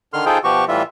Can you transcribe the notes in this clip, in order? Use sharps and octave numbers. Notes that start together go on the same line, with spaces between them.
D3 D#3 C6 F6
D#4 F4 G#4 A4 C5 G5
B2 F3 F#4 G4 C#6
A2 E3 G3 F4 E5